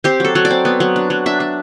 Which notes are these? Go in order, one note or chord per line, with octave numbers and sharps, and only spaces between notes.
C4 G4
F#3 A4
F#3
D5
C4
B3
F#3
D4
F#3
D4 E5
D4